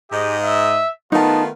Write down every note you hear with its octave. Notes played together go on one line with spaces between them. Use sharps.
G#2 G4 D#5
E5
D#3 A3 B3 D#4 F4 A5